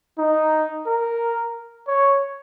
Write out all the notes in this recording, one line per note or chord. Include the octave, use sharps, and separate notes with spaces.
D#4
A#4
C#5